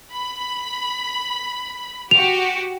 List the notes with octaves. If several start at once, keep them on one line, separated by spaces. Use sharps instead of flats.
B5
F#4 G4 F7